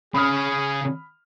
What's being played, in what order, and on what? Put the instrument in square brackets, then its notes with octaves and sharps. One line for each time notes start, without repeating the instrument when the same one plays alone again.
[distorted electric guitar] C#3 [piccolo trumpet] G#4 [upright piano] B5 D#6 F6